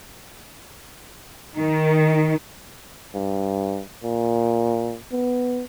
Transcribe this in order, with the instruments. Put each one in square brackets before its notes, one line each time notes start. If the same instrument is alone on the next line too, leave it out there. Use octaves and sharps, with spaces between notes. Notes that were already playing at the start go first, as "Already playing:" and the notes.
[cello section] D#3
[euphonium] G2
A#2
B3